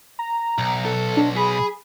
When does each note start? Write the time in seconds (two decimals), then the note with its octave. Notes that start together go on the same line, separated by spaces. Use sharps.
0.19 A#5
0.58 B1
0.85 A4
1.17 D4
1.36 G#4 B5